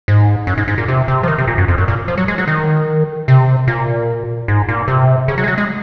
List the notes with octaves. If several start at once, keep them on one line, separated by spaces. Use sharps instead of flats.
G#2
F#2
G#2
G#2
A#2
C3
C3
F3
D#3
C3
A#2
F#2
F2
F#2
A#2
F3
F#3
G#3
F#3
D#3
C3
A#2
G#2
A#2
C3
C#3
F#3
G#3
F#3
G#3